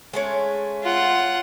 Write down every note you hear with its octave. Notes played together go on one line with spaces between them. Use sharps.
G#3 A3 C#4
F4 F#5